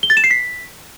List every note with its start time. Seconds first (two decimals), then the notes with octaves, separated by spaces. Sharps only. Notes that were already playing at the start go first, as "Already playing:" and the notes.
0.03 G7
0.10 A6
0.17 E7
0.24 C7
0.31 B6